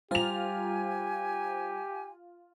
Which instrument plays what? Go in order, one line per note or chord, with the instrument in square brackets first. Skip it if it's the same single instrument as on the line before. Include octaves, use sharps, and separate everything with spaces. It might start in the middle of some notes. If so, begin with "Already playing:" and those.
[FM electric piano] G3 C5 A#5 [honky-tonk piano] F4 F7 [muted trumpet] G4 [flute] G#5